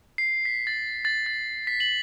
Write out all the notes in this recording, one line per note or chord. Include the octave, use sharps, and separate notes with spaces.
C7
B6
A6
A6
A6
B6
F#7